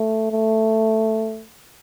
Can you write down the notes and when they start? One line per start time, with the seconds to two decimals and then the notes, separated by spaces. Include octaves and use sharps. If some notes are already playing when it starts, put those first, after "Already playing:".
Already playing: A3
0.32 A3